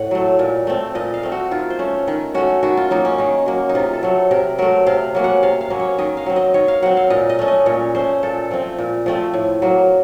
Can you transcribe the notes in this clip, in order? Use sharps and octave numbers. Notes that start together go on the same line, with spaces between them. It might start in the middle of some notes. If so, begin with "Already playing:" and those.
Already playing: A2 F#5
F#3 A3
A#2
A3 C4
A#2 D#5
F5
A3 C4
F#4
D#3 F4
C5
A3 C#4
D#3
A3 C#4 F#4
D#3 F#4
F4
F#3 A#3 D#4
C#4
D#3 D#4
F#3 A#3
D#4
C3 F4
A4
F#3 A3
C3 A#4
F#3 A3 A#4
C3 F5
F#3 A#3 C#4
F#5
C3 F5
F5
F#3 A#3 C#4
C#5
D#3 D#5
F5
F#3 C4
D#5
D#3 C#5
F5
F#3 C4 F#5
F5
A#2 D#5
D#5
A3 C#4
D#5
A#2 C#5
A3 C#4 C5
A#2 A4
F3 A3 C4
A#2
F3 A3 C4
A2
F#3 A#3